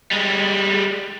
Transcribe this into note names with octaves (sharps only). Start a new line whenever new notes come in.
G3 G#3